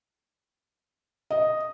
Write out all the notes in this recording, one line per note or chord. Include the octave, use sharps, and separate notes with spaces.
D#5